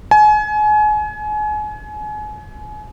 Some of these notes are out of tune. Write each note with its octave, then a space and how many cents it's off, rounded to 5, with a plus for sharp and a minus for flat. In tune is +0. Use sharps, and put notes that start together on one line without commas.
G#5 +30